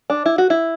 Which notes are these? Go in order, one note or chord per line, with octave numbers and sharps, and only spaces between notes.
D4
E4
F#4
E4